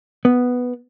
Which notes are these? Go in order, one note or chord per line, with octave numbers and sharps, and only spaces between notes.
B3